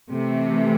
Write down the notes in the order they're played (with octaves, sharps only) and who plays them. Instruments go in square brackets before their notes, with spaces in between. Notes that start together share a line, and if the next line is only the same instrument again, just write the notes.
[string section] C3 E3 A3